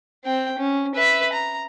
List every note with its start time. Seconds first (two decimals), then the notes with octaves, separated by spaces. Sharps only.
0.25 C4 G5
0.58 C#4
0.95 B4 E5
1.33 A#5